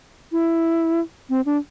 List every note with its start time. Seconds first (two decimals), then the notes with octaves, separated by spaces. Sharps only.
0.32 E4
1.29 C4
1.46 D4